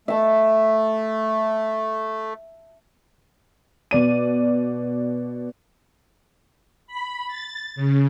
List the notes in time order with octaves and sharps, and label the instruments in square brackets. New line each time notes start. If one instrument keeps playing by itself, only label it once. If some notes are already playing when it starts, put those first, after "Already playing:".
[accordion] A3 [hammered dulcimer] E5 A5 C6
[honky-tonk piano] B2 D5 D#7
[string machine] B5
A6
C#3